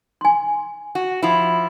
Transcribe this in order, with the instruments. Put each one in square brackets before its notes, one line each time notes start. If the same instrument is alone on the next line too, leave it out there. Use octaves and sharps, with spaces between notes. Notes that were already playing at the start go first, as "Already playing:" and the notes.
[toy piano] G#5 C6
[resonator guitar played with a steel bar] F#4
F3 E4